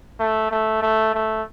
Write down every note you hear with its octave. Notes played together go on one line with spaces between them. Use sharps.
A3
A3
A3
A3